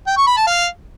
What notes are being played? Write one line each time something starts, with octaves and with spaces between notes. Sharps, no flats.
G5
C#6
B5
A5
F5